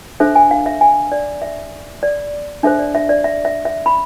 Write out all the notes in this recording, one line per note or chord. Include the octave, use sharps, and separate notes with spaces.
D4 A4 C5 E5
G#5
F5
E5
G#5
D5
E5
D5
D4 A4 C5 E5
D5
E5
D5
E5
E5
E5
B5